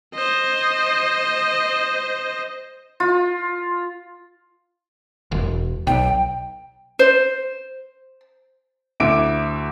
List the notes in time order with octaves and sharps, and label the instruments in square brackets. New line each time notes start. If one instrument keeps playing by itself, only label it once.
[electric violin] C5 D#5
[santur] F4
[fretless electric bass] E1
[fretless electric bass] B1 [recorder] G5
[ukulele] C5
[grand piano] D2 E4 E5 D6 D7